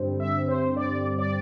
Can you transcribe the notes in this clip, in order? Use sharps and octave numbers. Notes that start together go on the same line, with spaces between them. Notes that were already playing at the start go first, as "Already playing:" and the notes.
Already playing: G2 D3 G3 C4
E5
C5
D5
D5